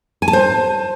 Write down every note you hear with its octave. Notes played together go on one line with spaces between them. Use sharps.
G#5
A5
C5